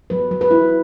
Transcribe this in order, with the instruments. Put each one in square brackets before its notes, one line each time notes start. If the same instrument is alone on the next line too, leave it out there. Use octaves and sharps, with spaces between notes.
[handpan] F#3 B4
F#3
B4
E4